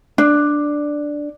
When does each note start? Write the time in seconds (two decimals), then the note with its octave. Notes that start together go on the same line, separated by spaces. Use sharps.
0.18 D4